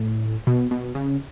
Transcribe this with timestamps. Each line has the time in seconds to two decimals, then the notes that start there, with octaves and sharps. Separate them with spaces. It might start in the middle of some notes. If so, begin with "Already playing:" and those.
Already playing: A2
0.47 B2
0.71 B2
0.95 C#3